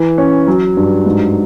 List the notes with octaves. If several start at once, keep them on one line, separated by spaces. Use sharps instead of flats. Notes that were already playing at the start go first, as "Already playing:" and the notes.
Already playing: E3
C#4
F#3
G2
G#2